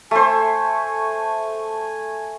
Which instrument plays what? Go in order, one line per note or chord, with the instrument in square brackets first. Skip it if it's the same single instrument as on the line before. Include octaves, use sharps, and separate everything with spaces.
[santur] A3 C5 [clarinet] G#5